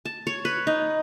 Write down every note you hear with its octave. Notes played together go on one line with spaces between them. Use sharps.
A5
C#5
B4
D#4